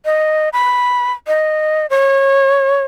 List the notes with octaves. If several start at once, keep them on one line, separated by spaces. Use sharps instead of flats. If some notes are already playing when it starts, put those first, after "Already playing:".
D#5
B5
D#5
C#5